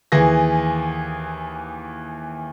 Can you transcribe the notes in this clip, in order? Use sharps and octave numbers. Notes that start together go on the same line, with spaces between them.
D#2 E3 G#4 A#6